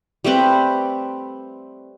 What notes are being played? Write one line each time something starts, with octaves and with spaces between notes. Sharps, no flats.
G3 A3 C4 B4